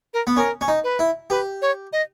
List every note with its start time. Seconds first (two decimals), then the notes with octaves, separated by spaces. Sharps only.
0.14 A#4
0.27 B3
0.36 C#4 A#4
0.61 C#4
0.68 D#4
0.84 B4
0.99 E4
1.30 G4 B4
1.62 C#5
1.93 D#5